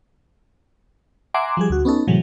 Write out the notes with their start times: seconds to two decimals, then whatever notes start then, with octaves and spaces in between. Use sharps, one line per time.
1.34 E5 F#5 G#5 A#5 C6 D6
1.57 F3 G3 G#4
1.70 D2 F#4
1.85 B3 C#4 D#4 A4
2.07 A2 C3 E3 F#3 G#3